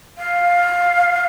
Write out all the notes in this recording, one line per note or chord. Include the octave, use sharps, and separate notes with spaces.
F5